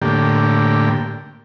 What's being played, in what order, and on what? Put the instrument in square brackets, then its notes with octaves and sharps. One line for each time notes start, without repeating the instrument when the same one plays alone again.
[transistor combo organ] A2 D3 A#3 G4